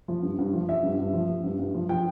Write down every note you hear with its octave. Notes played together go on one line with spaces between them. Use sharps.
F3
G2
G2
F3
F3 E5
G2
G2
F3
F3
G2
G2
F3
F3 G5